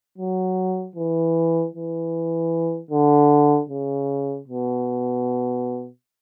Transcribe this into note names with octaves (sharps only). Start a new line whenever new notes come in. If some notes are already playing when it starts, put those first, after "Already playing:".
F#3
E3
E3
D3
C#3
B2